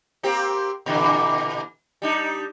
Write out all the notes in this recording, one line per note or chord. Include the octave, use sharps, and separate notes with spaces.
A#3 C4 G4
A#2 D3 E3
G3 D4 D#4